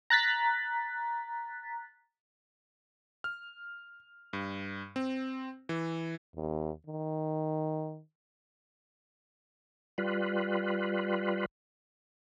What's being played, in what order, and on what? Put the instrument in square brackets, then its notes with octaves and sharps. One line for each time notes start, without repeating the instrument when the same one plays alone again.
[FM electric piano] A#5 F#6 A6 B6
[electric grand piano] F6
G2
C4
E3
[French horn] D#2
D#3
[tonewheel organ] G3 F4 B4